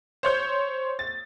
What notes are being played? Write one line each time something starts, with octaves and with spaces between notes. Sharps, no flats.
C5 C#5 G6
A6